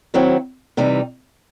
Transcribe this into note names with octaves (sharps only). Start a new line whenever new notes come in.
D#3 F#3 C4 E4
C3 E3 G3 D#4